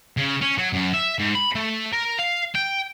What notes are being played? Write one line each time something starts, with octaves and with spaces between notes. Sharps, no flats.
C#3
C#4
F#3
F#2
E5
G#2
B5
A3
A#4
F5
G5